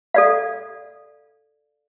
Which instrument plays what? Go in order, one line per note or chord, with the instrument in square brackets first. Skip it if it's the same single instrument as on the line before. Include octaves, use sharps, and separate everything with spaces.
[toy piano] A4 D5 F5